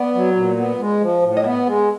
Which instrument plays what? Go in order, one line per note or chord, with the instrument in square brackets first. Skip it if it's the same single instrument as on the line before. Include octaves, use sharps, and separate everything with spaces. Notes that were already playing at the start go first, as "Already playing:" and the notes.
Already playing: [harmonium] B3 [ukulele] D5
[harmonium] F#3
A#2
B3
G#3
F3
A2
[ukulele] D#5
[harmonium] B3 [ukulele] E5
[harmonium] G#3